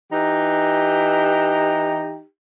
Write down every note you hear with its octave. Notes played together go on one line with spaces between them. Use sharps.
E3 D#4 G4